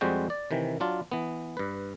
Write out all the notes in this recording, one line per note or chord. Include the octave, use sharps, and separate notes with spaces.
F2 G3 G#3 C4 F#4 G5
D5
C3 D#3 E3
F#3 D4 F4
E3 B3
G2 B4